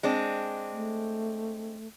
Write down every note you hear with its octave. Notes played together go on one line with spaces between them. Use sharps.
G#3 C4 D4
A3